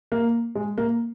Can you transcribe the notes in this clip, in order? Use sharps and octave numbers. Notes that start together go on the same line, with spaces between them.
A#3
G#3
A#3